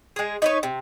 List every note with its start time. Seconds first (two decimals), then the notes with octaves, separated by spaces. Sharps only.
0.16 G#3 G#4
0.42 D#4 B4 C#5
0.63 C3